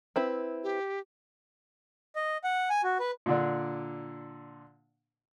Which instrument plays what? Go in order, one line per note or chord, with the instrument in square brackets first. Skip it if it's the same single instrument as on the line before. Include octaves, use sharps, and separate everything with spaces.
[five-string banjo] C4 E4 B4
[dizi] G4
[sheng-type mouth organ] D#5
F#5
G#5
F#4
B4
[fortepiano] A#2 D3 D4